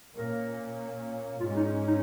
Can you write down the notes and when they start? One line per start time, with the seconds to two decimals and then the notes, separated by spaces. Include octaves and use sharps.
0.16 A#2 A#3 C#4 A#4
1.40 G#2 G#3 C#4 F4
1.57 D#4
1.88 D#4